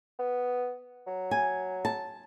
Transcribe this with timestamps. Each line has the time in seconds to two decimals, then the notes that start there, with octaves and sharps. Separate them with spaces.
0.19 B3
1.07 F#3
1.31 G#5
1.85 A5